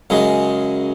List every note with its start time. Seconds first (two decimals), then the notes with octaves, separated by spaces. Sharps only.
0.10 F#2 C#3 G#3